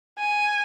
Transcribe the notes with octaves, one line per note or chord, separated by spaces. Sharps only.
G#5